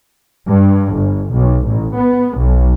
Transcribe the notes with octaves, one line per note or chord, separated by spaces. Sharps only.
G2
G1
B1
A1
B3
B1